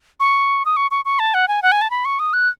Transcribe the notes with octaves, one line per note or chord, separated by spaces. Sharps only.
C#6
D#6
C#6
C#6
C#6
A5
F#5
G#5
F#5
G#5
A5
B5
C#6
D#6
F#6